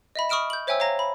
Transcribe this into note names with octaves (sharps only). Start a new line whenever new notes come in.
D#5 E5 B5
B5 C#6 D#6 F6 D7 E7
G6 F#7
C5 C#5 E5 G5 G#5 E6
C#5 F5 A#5 A#6
B5